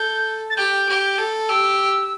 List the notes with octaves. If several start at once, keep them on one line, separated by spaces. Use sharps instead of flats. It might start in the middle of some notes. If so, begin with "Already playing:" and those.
Already playing: A4 G6
A6
G4 G6
G4
A4
G4 E6